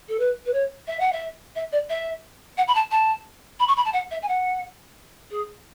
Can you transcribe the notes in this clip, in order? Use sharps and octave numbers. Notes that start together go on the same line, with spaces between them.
A4
B4
B4
C#5
E5
F#5
E5
E5
D5
E5
F#5
B5
A5
A5
B5
C#6
B5
A5
F#5
E5
G#5
F#5
G#4